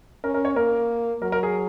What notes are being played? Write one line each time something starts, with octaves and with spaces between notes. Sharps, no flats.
C#4 A#4
A#4
C#5
A#3 A#4
F#3 A#4
A#4
G#4